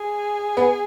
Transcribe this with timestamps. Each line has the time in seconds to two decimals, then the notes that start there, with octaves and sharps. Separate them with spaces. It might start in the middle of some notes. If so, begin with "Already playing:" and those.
Already playing: G#4
0.57 B3